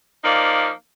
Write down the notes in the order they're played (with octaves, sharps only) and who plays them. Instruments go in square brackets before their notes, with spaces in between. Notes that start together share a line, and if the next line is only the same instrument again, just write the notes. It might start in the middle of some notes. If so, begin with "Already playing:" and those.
[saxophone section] F3 A#3 D#4 D5